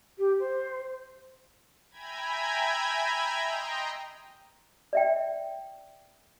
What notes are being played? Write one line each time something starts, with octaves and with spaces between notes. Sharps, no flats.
G4
C5
E5 G5 G#5 A#5 B5 G#6
D#5 G5 A#5 C6
D5 E5 G5